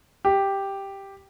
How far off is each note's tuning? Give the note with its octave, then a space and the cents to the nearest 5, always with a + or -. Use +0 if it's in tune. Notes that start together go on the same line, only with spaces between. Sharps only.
G4 +0